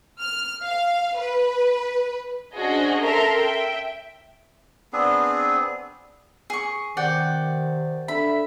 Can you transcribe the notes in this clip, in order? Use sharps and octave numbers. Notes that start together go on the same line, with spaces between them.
F6
F5
B4
C#4 D4 F#4 G#4 C5 D#5
A4 A#4 E5 A#5 C6
E5 G5
B3 C4 D4 G#4
G#4 C#6
C3 D#3 D5 F#5 G5
D3 E5 B5